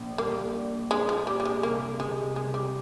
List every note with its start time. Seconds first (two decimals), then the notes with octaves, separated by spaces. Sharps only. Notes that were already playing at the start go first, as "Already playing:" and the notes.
Already playing: A#1
0.18 G3 A#3
0.55 D4
0.90 G#3 D4
1.09 F3
1.27 G3 D4
1.40 G3
1.45 G#3
1.63 C2 A#3
2.00 C3 G#3
2.36 C2 G#3
2.54 G3